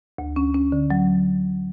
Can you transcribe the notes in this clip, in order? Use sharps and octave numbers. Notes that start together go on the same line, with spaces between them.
D2
C#4
C#4
D3
F#3